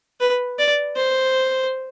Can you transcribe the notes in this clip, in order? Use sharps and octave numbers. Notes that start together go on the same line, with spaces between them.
B4
D5
C5